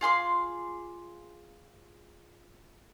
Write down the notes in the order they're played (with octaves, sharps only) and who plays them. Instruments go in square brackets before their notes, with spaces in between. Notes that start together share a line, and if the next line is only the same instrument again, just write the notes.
[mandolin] F4 G#4 C6 D6